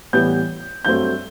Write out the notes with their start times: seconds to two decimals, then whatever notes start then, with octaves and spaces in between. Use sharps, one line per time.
0.13 A2 E3 G3 B3 G6
0.85 G2 F#3 A3 C4 G6